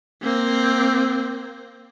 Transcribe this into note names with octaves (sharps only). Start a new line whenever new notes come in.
A#3 C4